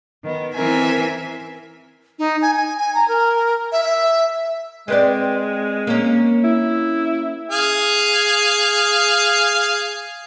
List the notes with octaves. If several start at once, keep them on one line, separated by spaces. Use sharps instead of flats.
D#3 B3
E3 C4 A#4 E5 G#5
D#4
G#5
G#5
G#5
A#5
A#4
E5
E5
G#3 C4 B4 D5
A#3 C#4
E4
G#4 F5